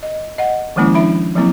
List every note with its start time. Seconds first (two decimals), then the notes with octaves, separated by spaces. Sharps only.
0.03 D#5
0.38 D#5 F#5
0.76 D#3 F3 G#3 A#3 C#4 E4
0.94 F3 D4 E4 E5 B5
1.35 F3 F#3 A#3 C4 E4